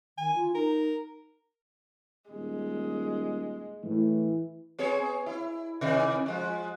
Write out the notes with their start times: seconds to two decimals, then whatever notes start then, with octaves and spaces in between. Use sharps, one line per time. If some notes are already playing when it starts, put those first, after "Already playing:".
0.18 D#3 G#5
0.35 F4
0.55 D#4 A#4
2.30 D#1 G#3
3.83 A2 E3
4.79 B3 G#4 C#5
5.26 E4
5.81 C3 D#3 E3
6.26 F3 G#3